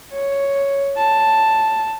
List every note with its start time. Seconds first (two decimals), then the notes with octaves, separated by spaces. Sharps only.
0.12 C#5
0.97 A5